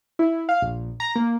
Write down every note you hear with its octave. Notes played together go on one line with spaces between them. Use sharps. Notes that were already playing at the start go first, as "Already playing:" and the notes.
E4
F5
A#1
A#5
A#3